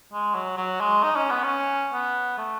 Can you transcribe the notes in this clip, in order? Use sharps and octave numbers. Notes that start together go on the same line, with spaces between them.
G#3
F#3
F#3
G#3
D#4
C#4
B3
C#4
B3
A3